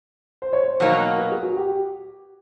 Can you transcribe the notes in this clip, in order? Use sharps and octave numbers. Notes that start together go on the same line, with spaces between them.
C5
C#5
C5
B2 F#3 A#3 D#4
B4
G#4
F#4
G4